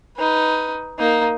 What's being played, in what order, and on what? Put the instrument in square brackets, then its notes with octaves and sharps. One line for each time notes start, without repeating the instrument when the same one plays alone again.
[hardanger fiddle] D#4 B4
A#3 D#4